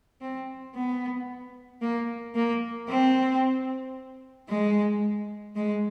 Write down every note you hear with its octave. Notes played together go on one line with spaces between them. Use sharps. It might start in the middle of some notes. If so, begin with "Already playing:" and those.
C4
B3
A#3
A#3
C4
G#3
G#3